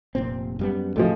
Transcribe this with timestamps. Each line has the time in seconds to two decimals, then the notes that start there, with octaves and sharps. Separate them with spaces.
0.15 F1 A#2 C4
0.59 F#2 G3 B3
0.96 D2 A2 C3 F3 G#3 A3